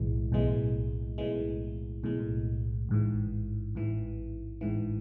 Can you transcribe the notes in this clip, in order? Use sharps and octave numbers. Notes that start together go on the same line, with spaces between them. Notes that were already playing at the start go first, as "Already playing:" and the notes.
Already playing: B1 A2 E3 G#3
B1 A2 E3 G#3
B1 A2 E3 G#3
B1 A2 E3 G#3
A1 G#2 E3
A1 G#2 E3
A1 G#2 E3